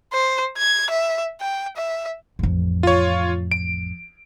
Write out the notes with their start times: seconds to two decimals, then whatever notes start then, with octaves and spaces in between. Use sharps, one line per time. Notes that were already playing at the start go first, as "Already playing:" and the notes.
0.13 C5
0.58 G#6
0.90 E5
1.40 G5
1.77 E5
2.39 A1 F2
2.83 F4 C#5
3.52 D7